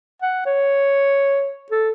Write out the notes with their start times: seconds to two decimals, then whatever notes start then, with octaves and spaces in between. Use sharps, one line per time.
0.22 F#5
0.46 C#5
1.72 A4